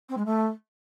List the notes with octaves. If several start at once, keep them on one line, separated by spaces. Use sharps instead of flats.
C4
G#3
A3